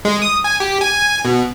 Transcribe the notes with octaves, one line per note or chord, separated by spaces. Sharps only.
G#3
D#6
G#5
G4
G#5
B2